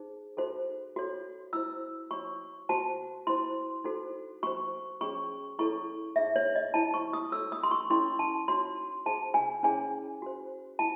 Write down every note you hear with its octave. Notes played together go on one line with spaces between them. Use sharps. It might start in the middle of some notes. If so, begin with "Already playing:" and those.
Already playing: D#4 G#4 C5
D#4 F#4 A4 C5
F#4 A4 C#5
E4 C5 E6
F#4 C#5 C#6
F#4 C5 A5
E4 C5 C6
D#4 F#4 A4 C5
F#4 C5 C#6
C#4 G#4 C#5 C#6
E4 A4 C#5 C#6
D#4 G#4 C#5 E5
C#5
D#5
E4 C5 A5
C#6
D#6
F#4 A4 C#5 E6
D#6
C6
C#6
C#4 E4 A4 C#5 C6
A5
D#4 F#4 C#5 C6
D#4 G#4 C5 A5
G#5
C#4 E4 G#4 C#5 G#5
F#4 C5
E4 A5